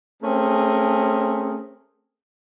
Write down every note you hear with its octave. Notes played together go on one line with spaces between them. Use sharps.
A3 C4 C#4 G#4 A#4